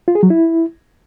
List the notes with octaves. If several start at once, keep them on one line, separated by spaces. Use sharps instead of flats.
F4
G#4
F#3
E4